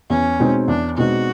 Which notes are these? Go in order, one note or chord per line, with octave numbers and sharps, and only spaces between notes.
E2 C#4
B2 G#3 C4 D#4
E2 D4
B2 G#3 C4 D#4 F#4